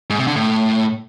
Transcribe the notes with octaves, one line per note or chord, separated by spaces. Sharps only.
G#2
C3
D3
A2